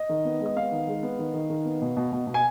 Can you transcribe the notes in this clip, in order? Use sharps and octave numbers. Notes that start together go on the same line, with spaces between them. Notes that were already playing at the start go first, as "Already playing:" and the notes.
Already playing: D#5
D#3
B3
G#3
D#5
B3 F5
D#3
G#3
B3
D#3
D#3
D#3
B3
B2
B2
B2
B2
G#5